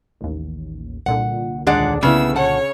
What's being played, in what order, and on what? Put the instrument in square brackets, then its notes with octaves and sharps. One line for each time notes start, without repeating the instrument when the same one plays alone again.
[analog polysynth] A1 D#2
[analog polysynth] C2 A#2 D3 [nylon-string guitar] F#5
[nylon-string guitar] D#2 D4 G#4 [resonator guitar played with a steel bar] G#3 D5 F#5
[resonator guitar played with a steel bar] C#3 [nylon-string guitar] A3 B3 E4 [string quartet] E6
[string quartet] C#5 [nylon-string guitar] F#5 A5